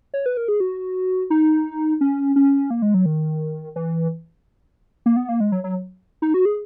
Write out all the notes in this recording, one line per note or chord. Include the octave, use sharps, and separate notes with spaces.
C#5
B4
A#4
G#4
F#4
D#4
C#4
C#4
A#3
G#3
F#3
D#3
E3
A#3
B3
A#3
G#3
F#3
F#3
D#4
F#4
G#4